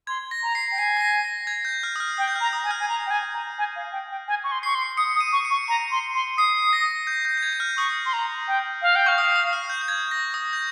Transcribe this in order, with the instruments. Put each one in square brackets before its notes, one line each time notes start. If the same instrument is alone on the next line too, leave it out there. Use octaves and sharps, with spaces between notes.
[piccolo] C6 [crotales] G#6
[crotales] A#6
[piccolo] A#5
[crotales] C7
[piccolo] G5
[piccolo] G#5 [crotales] C7
[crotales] A#6
C7
A#6
G#6
G6
F6
D#6
F6
[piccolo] G5 [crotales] D#6
[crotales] G6
F6
[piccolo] A#5
[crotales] D#6
[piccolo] G#5
[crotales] F6
[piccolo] G#5
A#5
G5
G#5
A#5
G#5
F5
G5
G5
G#5
C#6
C6
[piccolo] C#6 [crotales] C7
[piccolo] C6
[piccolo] D#6 [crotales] C#7
[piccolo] D#6
[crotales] D#7
[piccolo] C#6
[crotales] C#7
[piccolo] C#6
[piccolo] A#5 [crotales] D#7
[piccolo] C6
C6
[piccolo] D#6 [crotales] C7
[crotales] C7
A#6
G6
G6
G6
G#6
G6
F6
[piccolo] C#6 [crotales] D#6
[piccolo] C6
A#5
G5
F5
G5
[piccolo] F5 [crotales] C#6
[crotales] D#6
D#6
F6
G6
G6
G#6
A#6
D#6
G6